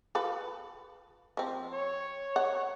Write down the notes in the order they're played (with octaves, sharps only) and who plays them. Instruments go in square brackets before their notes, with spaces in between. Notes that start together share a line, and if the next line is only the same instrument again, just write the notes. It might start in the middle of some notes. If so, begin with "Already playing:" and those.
[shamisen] F4 A4 B4
F3 C4
[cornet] C#5
[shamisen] F#5